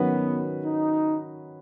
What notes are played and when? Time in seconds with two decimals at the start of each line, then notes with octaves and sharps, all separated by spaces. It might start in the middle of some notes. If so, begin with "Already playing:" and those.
Already playing: D#3 F#3 B3 C#4 F#4 B4
0.65 D#4